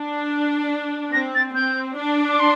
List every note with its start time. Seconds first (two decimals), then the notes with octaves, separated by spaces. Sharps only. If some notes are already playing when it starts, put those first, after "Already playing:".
Already playing: D4
1.13 C4 A#6
1.35 A6
1.55 C4 G6
1.97 D4
2.28 D6
2.39 C6